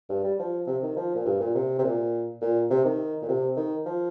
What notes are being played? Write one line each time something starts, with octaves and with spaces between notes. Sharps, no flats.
G2
G3
F3
C3
D#3
F3
A#2
G2
A#2
C3
C3
A#2
A#2
C3
D#3
A#2
C3
D#3
F3